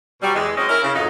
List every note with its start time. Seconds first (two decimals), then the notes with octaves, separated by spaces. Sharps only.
0.21 B2 F#3 G3
0.36 E2 E3 G#3
0.57 F#3 G#3 C4 C#4 D#5
0.69 C#4 E4 A#4
0.83 C#3
0.95 F2 G#2 F#3 D#4